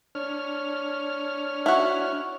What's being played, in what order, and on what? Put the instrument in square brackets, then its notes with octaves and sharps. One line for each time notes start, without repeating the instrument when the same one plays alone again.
[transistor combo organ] D4 C#5 F6
[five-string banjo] E4 F#4